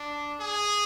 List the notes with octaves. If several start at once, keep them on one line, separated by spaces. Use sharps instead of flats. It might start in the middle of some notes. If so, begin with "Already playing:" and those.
Already playing: D4
G#4